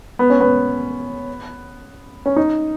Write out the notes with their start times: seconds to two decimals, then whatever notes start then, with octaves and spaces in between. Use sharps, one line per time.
0.19 B3
0.30 C#4
0.40 B3
2.26 C#4
2.36 D#4